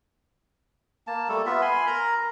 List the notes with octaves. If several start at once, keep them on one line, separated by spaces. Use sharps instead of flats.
A#3 A5
G3 A3 A4
B3 F4 E5
G#5 B5 C6
A#4 A#5